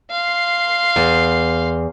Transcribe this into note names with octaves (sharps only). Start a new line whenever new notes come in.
F5 C6
E2